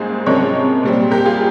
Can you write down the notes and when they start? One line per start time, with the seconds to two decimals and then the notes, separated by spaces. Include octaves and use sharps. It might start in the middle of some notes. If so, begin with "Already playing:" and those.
Already playing: G#2 G3 A#3 C#4 G#4 C5
0.26 C3 F3 G#3 C#4 A#4 C#5
0.83 A#2 G3 C4
1.11 G4 A#4
1.25 F4 G#4